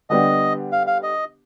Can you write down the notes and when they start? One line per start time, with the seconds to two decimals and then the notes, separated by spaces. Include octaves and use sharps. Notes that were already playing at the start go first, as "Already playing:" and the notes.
0.10 D3 G3 B3 D4 G4 D#5
0.72 F5
0.87 F5
1.03 D#5